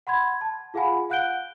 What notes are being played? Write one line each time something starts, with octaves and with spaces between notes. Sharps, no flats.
F#5 B5 C6 G#6
A5
F4 G#4 F5 F#5 G#5 B5
F5 F#5 F#6 G6 D7 G7